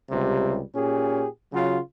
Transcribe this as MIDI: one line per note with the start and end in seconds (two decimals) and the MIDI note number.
0.10 0.63 37
0.10 0.63 48
0.10 0.63 55
0.75 1.26 46
0.75 1.26 61
0.75 1.26 67
0.75 1.26 68
1.53 1.79 49
1.53 1.79 54
1.53 1.79 65
1.53 1.79 66